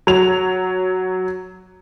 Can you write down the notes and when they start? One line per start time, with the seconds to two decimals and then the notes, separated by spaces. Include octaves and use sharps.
0.07 F#3 F7